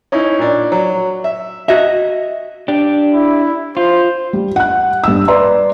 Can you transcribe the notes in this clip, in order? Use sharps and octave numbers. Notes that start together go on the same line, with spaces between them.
C#4 D#4 E4
A#2 D4
F#3
E5
F#4 D#5 E5
D4 G4
E4
F4 C5
G3
F#5 F#6
G2 E6
B4 D5 E5 A#5 C6